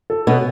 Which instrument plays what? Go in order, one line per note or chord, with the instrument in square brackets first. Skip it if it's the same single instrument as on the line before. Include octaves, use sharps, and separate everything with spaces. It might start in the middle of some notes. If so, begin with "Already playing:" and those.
[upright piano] A4
[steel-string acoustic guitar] B2 B3 [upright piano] C#4